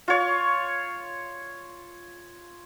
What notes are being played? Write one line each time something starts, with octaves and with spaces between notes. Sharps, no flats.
F4 C#5